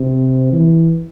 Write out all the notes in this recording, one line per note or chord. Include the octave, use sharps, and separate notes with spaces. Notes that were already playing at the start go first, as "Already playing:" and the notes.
Already playing: C3
E3